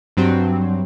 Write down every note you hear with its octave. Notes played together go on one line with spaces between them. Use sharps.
G2 F#3 C4